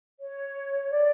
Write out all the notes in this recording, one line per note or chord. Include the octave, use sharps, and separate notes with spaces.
C#5
D5